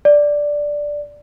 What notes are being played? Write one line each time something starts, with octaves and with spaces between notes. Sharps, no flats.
D5